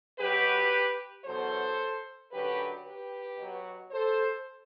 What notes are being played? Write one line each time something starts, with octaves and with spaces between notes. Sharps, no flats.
B2 F#3 G4 B4
E2 B2 F#3 A4 C5
F#2 D3 F#3 G4 B4
G4 B4
B2 F#3
A4 C5